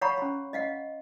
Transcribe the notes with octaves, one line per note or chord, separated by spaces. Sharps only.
C#5 F5 F#5 A#5 B5 C#6
C#4 C6
D#5 F5 F#5